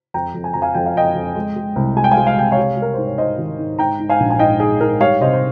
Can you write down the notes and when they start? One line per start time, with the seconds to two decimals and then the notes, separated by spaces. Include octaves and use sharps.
0.14 F2 G5 A#5
0.34 F2
0.44 G#5
0.54 F2 A#5
0.62 F5 G#5
0.75 F2 G5
0.86 F5
0.95 F2 D#5 G5
1.15 F2
1.36 G#3
1.56 G#3
1.76 C2
1.96 G#3 G#5
2.04 G5
2.11 F5 G#5
2.17 G#3
2.27 F5
2.37 C3 G5
2.52 C#5 F5
2.57 G3
2.77 G3
2.82 A#4
2.94 G#2 C5
3.07 C#5
3.18 G#2 C5 D#5
3.38 D#3
3.59 G#2
3.79 G#2 G5 A#5
3.99 G#2
4.09 F5 G#5
4.20 A#1
4.30 G#5
4.39 G#2 D#5 G5
4.60 G#2 G#4
4.80 G#2 A#4
5.00 G3 C#5 F5
5.20 C3 C5 D#5
5.33 C5